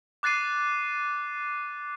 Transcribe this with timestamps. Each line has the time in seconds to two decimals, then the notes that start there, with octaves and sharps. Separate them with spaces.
0.23 D6 F#6 A6 C7 D#7